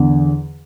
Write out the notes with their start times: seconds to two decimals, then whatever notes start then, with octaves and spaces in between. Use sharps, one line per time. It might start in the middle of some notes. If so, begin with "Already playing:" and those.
Already playing: E2 D3